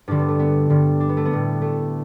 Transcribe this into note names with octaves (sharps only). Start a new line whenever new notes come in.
G2 D3 G3 D4
B3
A3
B3
G2 D3 G3
D4
B3
A3
B3
A2 G3
A3